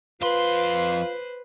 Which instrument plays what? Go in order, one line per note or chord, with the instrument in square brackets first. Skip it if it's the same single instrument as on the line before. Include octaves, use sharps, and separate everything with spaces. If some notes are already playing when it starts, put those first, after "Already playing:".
[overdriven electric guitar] F2 C6 [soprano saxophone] F4 [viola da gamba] B4 C5